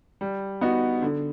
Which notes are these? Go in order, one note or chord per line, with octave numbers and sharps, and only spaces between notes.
G3
B3 D#4 F#4
D3